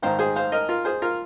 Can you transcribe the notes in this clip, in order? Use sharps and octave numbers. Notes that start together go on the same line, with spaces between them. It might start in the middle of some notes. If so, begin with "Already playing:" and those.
G#1 G#2 D#3 C5 F5
G#4 C5
C5 F5
A#4 D#5
F4 A#4
G#4 C5
F4 A#4